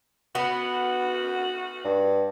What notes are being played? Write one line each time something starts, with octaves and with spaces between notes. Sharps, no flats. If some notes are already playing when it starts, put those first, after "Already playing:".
B3 F#4
G2